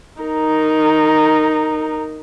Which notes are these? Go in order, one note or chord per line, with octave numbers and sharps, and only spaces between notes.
D#4 A#4